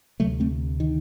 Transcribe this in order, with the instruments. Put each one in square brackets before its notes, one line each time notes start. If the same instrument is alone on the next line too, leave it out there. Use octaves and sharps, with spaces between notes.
[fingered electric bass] C3 F#3 A3
D2
A3 C4
D#3